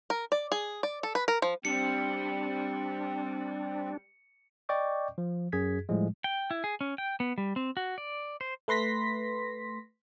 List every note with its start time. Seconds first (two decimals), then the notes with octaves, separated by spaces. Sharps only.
0.10 A#4
0.32 D5
0.52 G#4
0.83 D5
1.03 A4
1.15 B4
1.28 A#4
1.42 F3
1.65 G3 C4 D4 C#7
4.69 D5 D#5 G5 C#6 D6 G6
5.18 F3
5.52 F#2 G#4 G#6 B6
5.89 A2 F3 G3 G#3
6.24 G5
6.51 E4
6.64 G#4
6.81 C#4
6.98 G5
7.20 B3
7.38 G3
7.56 C4
7.77 F#4
7.98 D5
8.41 C5
8.68 A3 B4 C6 A#6 B6